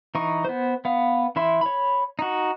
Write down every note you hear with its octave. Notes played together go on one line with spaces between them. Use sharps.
E3 D#4 C#6
B3 C5
B3 F5
E3 E4 E5 C6
C#5 B5
D#4 F#4